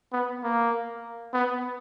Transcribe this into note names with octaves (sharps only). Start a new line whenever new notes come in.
B3
A#3
B3